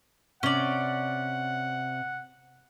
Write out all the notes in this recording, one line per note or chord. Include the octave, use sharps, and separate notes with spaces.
C3 C#4 D5 F#5